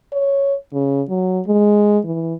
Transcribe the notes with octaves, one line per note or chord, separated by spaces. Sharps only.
C#5
C#3
F#3
G#3
E3